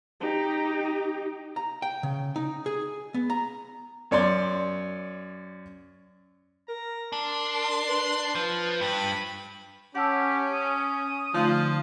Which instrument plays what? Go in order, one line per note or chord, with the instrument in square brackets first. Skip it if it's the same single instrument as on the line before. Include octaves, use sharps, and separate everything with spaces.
[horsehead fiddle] D#4 G4
[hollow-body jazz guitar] A#5
G5
C#3
D#4
G#4
B3
A#5
[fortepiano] F#2 C#5 D5 C6
[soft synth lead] A#4 [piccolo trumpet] A#5
[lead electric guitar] D4 [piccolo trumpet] C6
[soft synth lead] B4
[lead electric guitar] F3
[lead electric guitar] G2 [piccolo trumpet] B5
[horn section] C#4 [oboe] G4 [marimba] F#5 A5 E6
[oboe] D#6
[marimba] D3 A3 D#4 [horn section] F3 F4